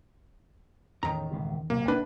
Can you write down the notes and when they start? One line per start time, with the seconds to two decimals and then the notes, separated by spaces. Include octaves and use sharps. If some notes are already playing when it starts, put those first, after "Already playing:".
1.03 E2 A2 D#3 C#4 A#5
1.31 D#1 C#2 C3
1.70 D1 C3 F#3 A#3
1.88 G1 A#3 D4 B4